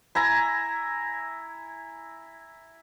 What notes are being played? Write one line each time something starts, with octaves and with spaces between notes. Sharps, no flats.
E4 G#5 A#5